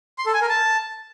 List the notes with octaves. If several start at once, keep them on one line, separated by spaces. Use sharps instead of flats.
C6
A4
G#5
A#4
A5